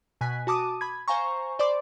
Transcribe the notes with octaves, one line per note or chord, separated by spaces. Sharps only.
B2 G#5 F#6 B6
F#4 A5 D6 D#6 D#7
B5 G#6
C5 F5 G#5 A#5 C#6
C5 D5 B5 C6 D6